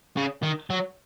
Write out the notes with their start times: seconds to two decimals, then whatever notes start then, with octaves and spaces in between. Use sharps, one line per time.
0.17 C#3
0.43 D#3
0.70 F#3